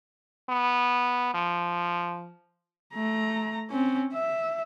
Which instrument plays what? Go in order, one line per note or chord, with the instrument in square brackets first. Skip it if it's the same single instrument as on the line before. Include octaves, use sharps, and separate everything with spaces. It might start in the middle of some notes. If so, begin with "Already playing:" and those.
[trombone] B3
F3
[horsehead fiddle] A3 A#5
C4 C#4
E5